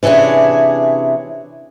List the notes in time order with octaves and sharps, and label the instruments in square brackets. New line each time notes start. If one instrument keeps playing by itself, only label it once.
[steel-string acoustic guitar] C3 E3 C#4 D4 G#4